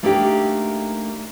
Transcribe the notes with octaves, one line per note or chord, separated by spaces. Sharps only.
A3 A#3 D4 D#4 F#4 G4